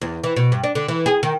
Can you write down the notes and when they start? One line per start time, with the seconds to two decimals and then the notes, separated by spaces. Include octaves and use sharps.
0.01 E2
0.24 E3
0.36 B2
0.52 G2
0.64 D4
0.75 D3
0.88 E3
1.06 G#4
1.23 D#3